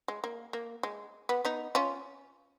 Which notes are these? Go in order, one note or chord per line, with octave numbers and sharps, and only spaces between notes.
G#3
A#3
A#3
G#3
B3
B3 D#4
C#4 F4